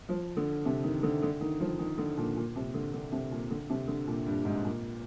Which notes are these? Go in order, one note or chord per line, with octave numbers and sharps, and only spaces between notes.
F3
D3
C3
D#3
D3
D3
D#3
F3
D#3
D3
A#2
A#2
C3
D3
D3
C3
A#2
D3
C3
D3
A#2
G2
G#2
A#2